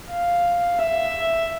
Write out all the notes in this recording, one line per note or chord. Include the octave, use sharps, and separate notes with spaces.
F5
E5